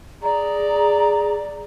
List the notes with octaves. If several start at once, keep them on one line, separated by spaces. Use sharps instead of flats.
G#4 D5 A#5